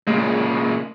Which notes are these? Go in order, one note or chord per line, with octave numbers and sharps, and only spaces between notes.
A#2 C#3 G#3